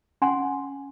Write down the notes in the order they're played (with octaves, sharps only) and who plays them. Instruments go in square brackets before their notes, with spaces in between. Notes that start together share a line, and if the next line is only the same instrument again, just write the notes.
[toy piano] C#4 F#5 G#5 C6